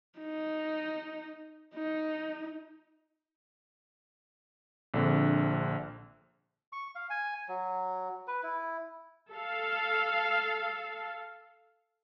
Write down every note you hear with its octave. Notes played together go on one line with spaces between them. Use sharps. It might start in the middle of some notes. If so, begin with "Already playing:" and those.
D#4
D#4
A#1 D3 C4
C#6
F5
G#5
F#3
B4
E4
A4 F5